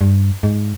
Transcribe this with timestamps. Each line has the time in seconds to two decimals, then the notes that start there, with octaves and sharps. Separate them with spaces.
0.01 G2
0.43 G#2